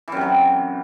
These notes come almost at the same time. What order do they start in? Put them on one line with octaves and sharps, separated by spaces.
E3 F#2 C3 F#3